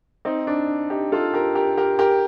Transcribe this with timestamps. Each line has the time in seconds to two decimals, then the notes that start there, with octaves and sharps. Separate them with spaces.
0.25 C4 D#4
0.47 D4
0.90 D#4 G4
1.12 F4 A4
1.34 G4 A#4
1.55 G4 A#4
1.77 G4 A#4
1.99 G4 A#4